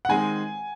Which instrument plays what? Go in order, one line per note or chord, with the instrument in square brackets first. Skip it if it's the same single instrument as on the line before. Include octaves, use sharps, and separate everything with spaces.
[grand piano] F#5
[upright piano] D#3 G#3 C4 [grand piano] G#5